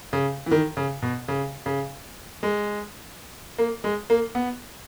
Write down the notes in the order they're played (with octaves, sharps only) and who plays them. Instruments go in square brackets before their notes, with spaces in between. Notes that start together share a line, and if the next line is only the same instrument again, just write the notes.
[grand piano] C#3
E3
D#3
C#3
B2
C#3
C#3
G#3
A#3
G#3
A#3
B3